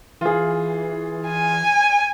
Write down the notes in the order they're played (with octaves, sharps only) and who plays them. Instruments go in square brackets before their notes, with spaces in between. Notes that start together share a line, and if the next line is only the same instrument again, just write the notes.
[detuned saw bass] E3 [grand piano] F4 G#4
[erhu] G#5